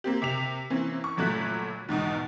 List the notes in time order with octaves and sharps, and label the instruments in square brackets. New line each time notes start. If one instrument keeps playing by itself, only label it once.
[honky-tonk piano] A#3 C4 G4
C3 B6 F7
E3 A#3 C4 C#4
C#6
G1 A#2 F#3 A3 F#6 B6
E2 G#2 B2 D#3